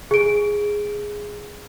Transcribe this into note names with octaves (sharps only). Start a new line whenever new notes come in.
G#4 D7